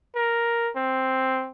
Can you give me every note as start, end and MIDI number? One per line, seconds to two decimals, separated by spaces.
0.16 0.71 70
0.76 1.51 60